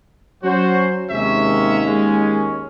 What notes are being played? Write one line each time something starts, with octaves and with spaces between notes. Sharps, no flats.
F#3 C#4 F#4 C5
D#2 C3 G#3 C#4 E5
G#3